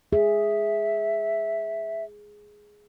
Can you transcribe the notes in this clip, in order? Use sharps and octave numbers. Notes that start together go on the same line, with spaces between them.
G#4 E5